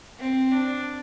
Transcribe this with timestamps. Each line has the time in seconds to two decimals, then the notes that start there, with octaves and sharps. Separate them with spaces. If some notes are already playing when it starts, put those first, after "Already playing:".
0.19 C4
0.52 D4